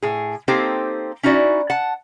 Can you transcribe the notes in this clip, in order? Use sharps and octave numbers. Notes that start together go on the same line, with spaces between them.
A2 G#4
A#3 C4 D#4 G4 A4 C5
C#4 D#4 E4 F#4 D5
F#5 A5